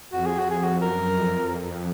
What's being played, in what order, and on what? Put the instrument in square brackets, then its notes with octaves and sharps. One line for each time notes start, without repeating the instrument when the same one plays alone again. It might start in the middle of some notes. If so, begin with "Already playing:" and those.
[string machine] F2 [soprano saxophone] F#4
[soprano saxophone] G#4
F#4
G#4
F#4
[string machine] F#2 [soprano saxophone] A#4
[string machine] F2